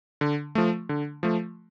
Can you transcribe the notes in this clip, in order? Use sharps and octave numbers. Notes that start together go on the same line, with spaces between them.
D3
F3 A3
D3
F3 A3